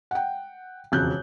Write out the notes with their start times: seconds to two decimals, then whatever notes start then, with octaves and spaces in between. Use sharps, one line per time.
0.11 F#5 G5
0.92 E1 F2 C#3 F#6 G6